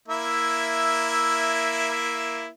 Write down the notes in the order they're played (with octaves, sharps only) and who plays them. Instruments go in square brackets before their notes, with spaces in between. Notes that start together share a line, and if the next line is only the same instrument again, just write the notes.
[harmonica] A#3 E4 E5